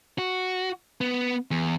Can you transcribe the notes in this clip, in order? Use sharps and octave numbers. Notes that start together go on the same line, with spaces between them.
F#4
B3
E2